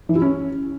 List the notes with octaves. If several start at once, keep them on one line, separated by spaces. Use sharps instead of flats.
E3
E4
C#4